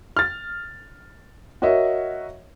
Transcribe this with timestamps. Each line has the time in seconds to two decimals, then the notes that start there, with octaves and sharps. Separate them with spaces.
0.17 F6 A6
1.62 F#4 A#4 C#5 D#5 E5